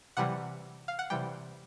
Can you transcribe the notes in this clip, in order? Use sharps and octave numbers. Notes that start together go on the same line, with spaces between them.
C3 E3 G3 F#5
F5
F#5
C3 E3 G3 G5